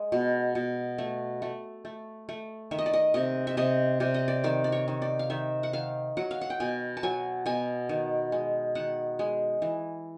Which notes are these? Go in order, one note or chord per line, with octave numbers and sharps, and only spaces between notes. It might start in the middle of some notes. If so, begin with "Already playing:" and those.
Already playing: G#3
B2
B2
A3
A3
A3
A3
D#3 E5
D#5
D5
D#5
C3 D#5
E5
C3 D#5
C3 D5
D#5
D5
D#3 D5
D5
C#5
D#3
D5
F5
D#3 E5
F#5
D#3 F5
F#3 F#5
F5
F#5
G5
B2 G#5
A5
F#3 G#5
B2 G#5
D#3
G#3
D#3 F#5
G#3
E3